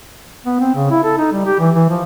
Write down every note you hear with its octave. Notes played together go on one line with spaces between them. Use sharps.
B3
C4
C#3
E4
A4
D#4
G3
G4
E3
E3
F3